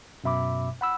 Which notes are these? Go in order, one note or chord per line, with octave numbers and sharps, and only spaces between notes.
F#2 B2 E5 B5 D6
F#5 B5 E6